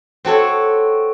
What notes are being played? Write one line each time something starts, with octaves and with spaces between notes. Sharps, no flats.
C4 F#4 A4 C#5